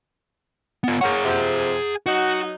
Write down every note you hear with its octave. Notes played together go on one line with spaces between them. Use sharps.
B3 F4
A#3 G#4 C#5 F#5
F2 C3
F#3 D#4 F#4